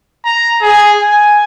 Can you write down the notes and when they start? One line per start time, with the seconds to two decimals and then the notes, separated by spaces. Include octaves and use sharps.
0.25 A#5
0.62 G#4
1.01 G#5